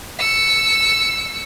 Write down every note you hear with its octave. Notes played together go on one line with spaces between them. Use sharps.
E6 C#7